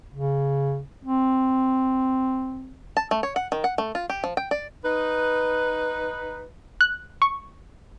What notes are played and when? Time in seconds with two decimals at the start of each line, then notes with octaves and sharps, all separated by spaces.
0.14 C#3
1.05 C4
2.97 A5
3.11 A3
3.23 C#5
3.36 F#5
3.52 D#3
3.64 F#5
3.78 A3
3.95 F4
4.10 G4
4.24 F3
4.37 G5
4.51 D5
4.83 D#4 B4
6.81 F#6
7.22 C#6